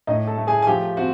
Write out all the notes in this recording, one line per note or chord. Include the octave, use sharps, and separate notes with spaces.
A2 D#4 D#5
A4 A5
A3
G#4 G#5
G#5
F3 G4 G5
C4 F#4 F#5